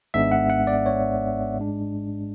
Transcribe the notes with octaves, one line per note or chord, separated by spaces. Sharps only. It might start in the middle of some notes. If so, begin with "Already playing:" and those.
G#1 G#2 G#3 B3 D4 E5
F#5
F#5
D5
C#5
G#2 G#3 D4